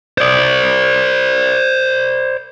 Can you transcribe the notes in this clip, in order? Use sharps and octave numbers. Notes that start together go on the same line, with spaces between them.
C5 D5